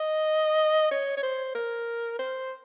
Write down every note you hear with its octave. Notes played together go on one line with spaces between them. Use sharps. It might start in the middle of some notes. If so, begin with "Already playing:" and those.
Already playing: D#5
C#5
C#5
C5
A#4
C5